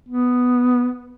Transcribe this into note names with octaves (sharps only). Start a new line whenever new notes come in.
B3